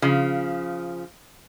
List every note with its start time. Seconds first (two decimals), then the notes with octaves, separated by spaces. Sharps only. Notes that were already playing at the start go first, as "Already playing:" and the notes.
0.02 C#3 F3